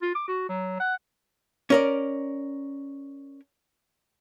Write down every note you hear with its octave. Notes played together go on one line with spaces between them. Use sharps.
F4
D6
F#4
F#3
F#5
C#4 A#4 D5